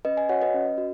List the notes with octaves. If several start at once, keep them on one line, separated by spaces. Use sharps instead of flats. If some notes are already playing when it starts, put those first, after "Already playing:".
C#4 B4 D#5
D#5 G#5
F#4 C#5 F#5
B4 D#5
C#4
F#4